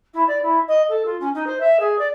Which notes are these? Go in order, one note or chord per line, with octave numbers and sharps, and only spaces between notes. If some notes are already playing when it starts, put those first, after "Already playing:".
E4
D5
E4
D#5
A4
F4
C#4
D#4
C5
E5
G#4
D5